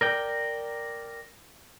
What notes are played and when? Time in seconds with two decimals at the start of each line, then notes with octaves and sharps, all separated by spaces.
0.01 A#4 D5 G5